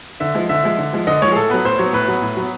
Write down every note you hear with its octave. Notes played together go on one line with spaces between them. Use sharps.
D3 E5
F3 G#3
D3 E5
F3 G#3
D3
F3 G#3
D3 D#5
F3 G#3 C#5
G#4
A2 A4
F#3 B3 B4
A2 C5
F#3 B3 C#5
A2 B4
F#3 B3
A2
F#3 B3